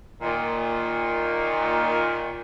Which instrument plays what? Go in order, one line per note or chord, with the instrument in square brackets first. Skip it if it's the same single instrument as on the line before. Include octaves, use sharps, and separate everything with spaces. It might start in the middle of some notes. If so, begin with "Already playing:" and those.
[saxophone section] A#2 D#3